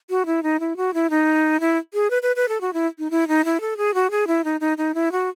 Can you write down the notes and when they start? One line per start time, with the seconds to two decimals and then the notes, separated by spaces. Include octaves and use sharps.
0.10 F#4
0.26 E4
0.43 D#4
0.60 E4
0.77 F#4
0.94 E4
1.10 D#4
1.60 E4
1.94 G#4
2.10 B4
2.22 B4
2.36 B4
2.48 A4
2.61 F#4
2.73 E4
2.99 D#4
3.10 E4
3.28 D#4
3.45 E4
3.61 A4
3.77 G#4
3.94 F#4
4.11 G#4
4.27 E4
4.44 D#4
4.60 D#4
4.78 D#4
4.94 E4
5.12 F#4